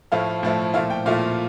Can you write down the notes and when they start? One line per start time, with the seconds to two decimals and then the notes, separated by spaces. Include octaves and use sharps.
0.12 A2 F3 A3 E4 F5
0.43 A2 F3 A3 E4
0.74 A#2 F3 A3 E4 F5
0.90 G5
1.06 A#2 F3 A3 E4 F5